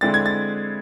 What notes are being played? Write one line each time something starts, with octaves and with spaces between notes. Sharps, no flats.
D3 G#3 C4 E4 A6
G#6
A6